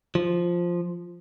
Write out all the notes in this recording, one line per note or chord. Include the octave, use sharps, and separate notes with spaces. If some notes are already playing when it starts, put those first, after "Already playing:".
F3